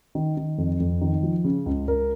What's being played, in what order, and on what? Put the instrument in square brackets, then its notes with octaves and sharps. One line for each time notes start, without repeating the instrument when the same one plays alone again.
[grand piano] D#3
D#3
F2
F2
D#3
F3
C#3
C#2
C#2 A#4